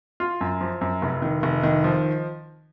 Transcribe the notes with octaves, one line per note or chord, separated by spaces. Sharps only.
F4
F#2
F3
F#2
F1
D#3
F1
D#3
F3